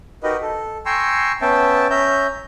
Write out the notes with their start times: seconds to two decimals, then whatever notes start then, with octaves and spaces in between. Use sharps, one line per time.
0.23 D#4 F#4 G4 A#4 B4 D#5
0.42 A4
0.86 G5 G#5 A#5 C6 C#6 E6
1.41 B3 C#4 E5 G5 A5
1.90 C#4 E5 A#5 G6